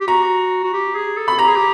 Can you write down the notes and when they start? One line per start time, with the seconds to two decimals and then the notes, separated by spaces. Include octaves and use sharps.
0.01 G4
0.07 F#4 A#5
0.64 F#4
0.73 G4
0.95 G#4
1.17 A4
1.28 B5
1.39 G4 A#5
1.48 G#4
1.56 G4